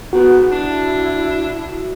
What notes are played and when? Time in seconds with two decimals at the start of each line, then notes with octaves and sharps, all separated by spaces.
0.13 G#2 B3 F#4
0.52 D4 E4